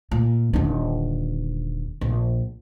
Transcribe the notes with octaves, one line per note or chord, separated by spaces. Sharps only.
A#2
D#1 D3
A#1